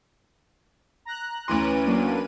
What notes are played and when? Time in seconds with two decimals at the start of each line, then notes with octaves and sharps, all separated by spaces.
1.05 A#5 F#6
1.48 D2 E3 C#4 B4 C6 D#7
1.86 F#3 A#3 D4